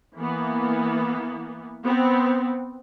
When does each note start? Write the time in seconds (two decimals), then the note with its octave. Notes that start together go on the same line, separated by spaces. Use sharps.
0.16 E3 A#3 B3
1.84 B3 C4